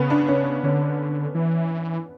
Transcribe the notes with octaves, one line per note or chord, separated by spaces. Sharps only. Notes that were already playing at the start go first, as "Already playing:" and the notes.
Already playing: C#3 B3
D4
C#4
D3 C#4
E3